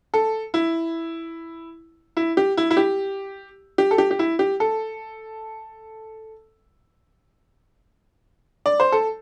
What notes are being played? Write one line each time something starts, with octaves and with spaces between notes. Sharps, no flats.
A4
E4
E4
G4
E4
E4
G4
G4
A4
G4
G4
E4
G4
A4
D5
C5
A4